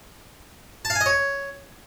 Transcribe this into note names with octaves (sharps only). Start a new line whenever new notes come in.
A5
F5
G#5
D#5
C#5